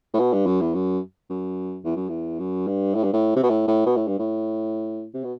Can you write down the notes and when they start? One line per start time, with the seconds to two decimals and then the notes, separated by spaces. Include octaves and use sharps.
0.14 A2
0.19 B2
0.33 G2
0.46 F#2
0.60 E2
0.74 F#2
1.30 F#2
1.84 E2
1.96 F#2
2.08 E2
2.39 F#2
2.67 G2
2.95 A2
3.04 G2
3.13 A2
3.36 C3
3.43 B2
3.50 A2
3.67 A2
3.86 B2
3.96 A2
4.07 G2
4.19 A2
5.14 C3
5.24 B2